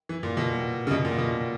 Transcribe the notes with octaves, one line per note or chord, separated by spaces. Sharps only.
E3
A#2
B2
C#3
B2
A#2
B2